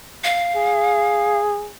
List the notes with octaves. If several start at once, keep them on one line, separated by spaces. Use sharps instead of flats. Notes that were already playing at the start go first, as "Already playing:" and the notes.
F5
G#4